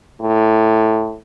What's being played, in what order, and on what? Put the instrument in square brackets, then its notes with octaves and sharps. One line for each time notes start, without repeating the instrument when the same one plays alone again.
[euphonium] A2